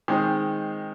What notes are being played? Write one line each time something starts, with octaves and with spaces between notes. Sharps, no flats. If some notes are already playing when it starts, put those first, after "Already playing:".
D#3 G#3 C4 D#4